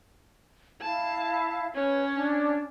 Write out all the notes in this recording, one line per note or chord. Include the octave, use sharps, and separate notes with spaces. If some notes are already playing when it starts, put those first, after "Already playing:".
E4 F5 A5
C#4 B4 C#5
D4